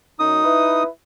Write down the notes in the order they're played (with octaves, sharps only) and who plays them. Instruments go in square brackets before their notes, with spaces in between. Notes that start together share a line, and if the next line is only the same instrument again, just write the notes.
[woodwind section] F#2 [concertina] D#4 D#6
[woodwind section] E4 B4